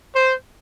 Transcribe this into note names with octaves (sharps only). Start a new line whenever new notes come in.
C5